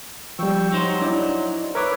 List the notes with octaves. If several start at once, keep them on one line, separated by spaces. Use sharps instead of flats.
F3 G3 G5 C#6 E6
F#3 D#4 C5
D4 E4 D5
A#4 B4 C#5 E5 D6